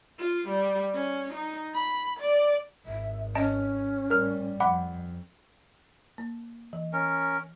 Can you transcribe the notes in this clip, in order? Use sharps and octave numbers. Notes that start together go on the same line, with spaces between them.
F4
G3
C#4
D#4
B5
D5
G#1 E5
C#4 D#5 A5 D7
A2 G3 A#4 F6
F2 F#5 B5 D6
A#3
E3
C#4 A#4